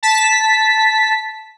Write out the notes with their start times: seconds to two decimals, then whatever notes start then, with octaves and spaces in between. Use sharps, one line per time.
0.03 A5 B6